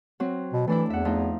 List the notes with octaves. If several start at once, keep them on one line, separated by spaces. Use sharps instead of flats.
F#3 C4
B2
E3 A3 D4 E4
E2 E5 F#5
F3 A3 D#4